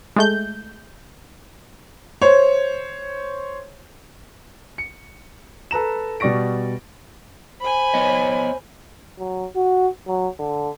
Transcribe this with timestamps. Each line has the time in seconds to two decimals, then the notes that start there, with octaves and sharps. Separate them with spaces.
0.16 G#3 A3 G6
2.22 C5 C#5
4.78 C#7
5.71 A4 B4 A#5 E7
6.20 B2 G3 D5 C#6 A#6 D7
7.61 C5 G#5 B5
7.94 B3 C#5 D#5
9.19 F#3
9.56 F#4
10.07 F#3
10.39 D3